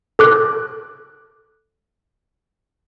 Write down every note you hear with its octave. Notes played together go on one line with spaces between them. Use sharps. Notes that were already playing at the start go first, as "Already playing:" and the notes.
A4 D6 F#6